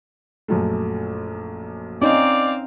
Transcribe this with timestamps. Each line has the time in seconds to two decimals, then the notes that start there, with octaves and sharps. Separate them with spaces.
0.48 A#1 F#2 A3
2.02 C4 C#4 D#4 D5 D#5 F5